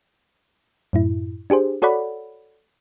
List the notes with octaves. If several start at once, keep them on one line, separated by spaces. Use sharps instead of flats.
F#2 A2 E4
D4 G4 G#4 C5
F#4 A4 C#5 D5 F#5 B5